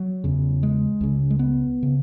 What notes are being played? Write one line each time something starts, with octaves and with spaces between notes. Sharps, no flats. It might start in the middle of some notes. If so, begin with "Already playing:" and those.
Already playing: F#3
E2 C#3
G#3
C#2 C#3
G#3
B3
C#3